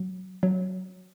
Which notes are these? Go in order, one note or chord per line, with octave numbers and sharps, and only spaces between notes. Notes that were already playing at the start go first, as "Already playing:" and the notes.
Already playing: F#3
F#3